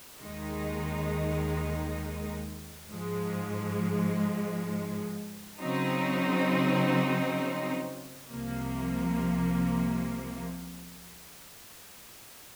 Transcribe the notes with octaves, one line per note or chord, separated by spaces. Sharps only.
D#2 D#3 G#3 D#4
G#2 F3 G#3
C#3 F#3 C4 D#4
C2 C3 F3 A#3